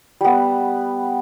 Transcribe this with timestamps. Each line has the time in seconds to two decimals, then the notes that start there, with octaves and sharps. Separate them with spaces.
0.21 G3 B3